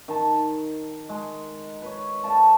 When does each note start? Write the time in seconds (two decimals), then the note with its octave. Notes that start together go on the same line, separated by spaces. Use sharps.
0.08 D#3 D#4 A5
1.09 G#3
1.82 B4 C#5
2.24 A4 D5 F5 A5